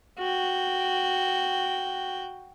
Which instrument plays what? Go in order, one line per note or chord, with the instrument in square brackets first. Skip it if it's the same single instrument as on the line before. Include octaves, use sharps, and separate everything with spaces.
[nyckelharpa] F#4 G5